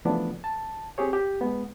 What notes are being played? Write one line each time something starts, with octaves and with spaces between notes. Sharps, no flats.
C#3 E3 F3 A3 B3 D4
A5
C4 G4 G#4 C#5
G4
G#3 B3